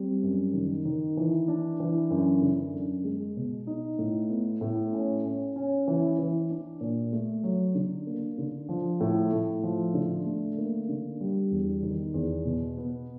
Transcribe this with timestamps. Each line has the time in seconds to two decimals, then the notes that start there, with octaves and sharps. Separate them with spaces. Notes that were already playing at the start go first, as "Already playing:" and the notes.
Already playing: G3 C4
0.23 F#2
0.53 D#3
0.85 D#3
1.17 E3
1.48 D4
1.80 E3
2.10 F#2
2.42 D3
2.74 F#2
3.04 G#3
3.37 B2
3.67 D#4
3.99 A2
4.30 B3
4.61 A2
4.92 C#4
5.24 C#4
5.56 C#4
5.88 E3
6.19 E3
6.50 D4
6.81 A#2
7.13 A3
7.44 F#3
7.75 D3
8.07 A#3
8.38 D3
8.69 F3
9.00 A2
9.33 A2
9.63 F3
9.94 D3
10.26 A3
10.58 A#3
10.89 D3
11.21 G3
11.51 E2
11.83 D#3
12.14 E2
12.45 B2
12.77 B3